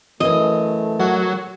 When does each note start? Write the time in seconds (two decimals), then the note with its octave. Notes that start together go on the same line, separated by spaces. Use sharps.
0.20 F#2 E3 A3 D#5
1.00 F#3 F#4 A#4 F#5